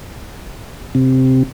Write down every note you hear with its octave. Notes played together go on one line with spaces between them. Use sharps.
C3